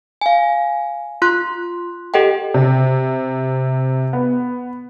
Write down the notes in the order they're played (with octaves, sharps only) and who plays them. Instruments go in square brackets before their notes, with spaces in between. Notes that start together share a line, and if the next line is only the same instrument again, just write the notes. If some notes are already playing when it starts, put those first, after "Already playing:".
[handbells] F5 G#5
F4 C6 F#6
G4 A4 D#5 F#5 G5
[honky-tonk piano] C3
B3